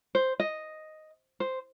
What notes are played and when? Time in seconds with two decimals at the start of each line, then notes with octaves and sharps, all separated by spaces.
0.15 C5
0.40 D#5
1.40 C5